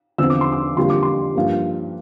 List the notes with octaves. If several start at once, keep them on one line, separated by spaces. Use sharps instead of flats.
E2 D3 F3 C4 E6
D6
C6
D6
F2 D3 G3 A#3 C6
D6
C6
G2 F3 A#3